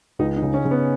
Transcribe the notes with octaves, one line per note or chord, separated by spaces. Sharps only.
C#2 D#4
D#4
C#3
C#4
C#3
B3